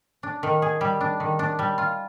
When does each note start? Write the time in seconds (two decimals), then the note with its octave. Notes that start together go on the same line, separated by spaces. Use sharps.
0.23 D4
0.43 D#3
0.62 G#4
0.81 G3
1.01 D4
1.20 D#3
1.39 D4
1.59 G3
1.78 F4